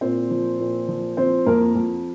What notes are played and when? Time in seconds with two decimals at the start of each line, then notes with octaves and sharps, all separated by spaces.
0.01 A#2 C4 C5
0.31 F3
0.59 A#2
0.88 F3
1.17 F3 C4 C5
1.46 F2 A#3 A#4
1.75 F2